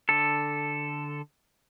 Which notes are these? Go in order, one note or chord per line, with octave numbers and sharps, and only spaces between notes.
D3 A4